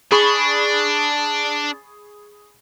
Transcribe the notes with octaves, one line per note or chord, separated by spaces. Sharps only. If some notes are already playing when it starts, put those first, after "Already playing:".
D4 G#4 B5 C#6